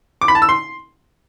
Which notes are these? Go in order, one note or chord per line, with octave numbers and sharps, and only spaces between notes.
D6
B5
A5
E6
C6